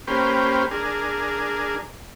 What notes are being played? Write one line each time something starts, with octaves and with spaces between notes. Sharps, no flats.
A#3 C#4 G4 B4 C5
D4 G#4 A#4